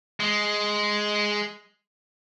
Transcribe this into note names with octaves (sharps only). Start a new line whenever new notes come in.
G#3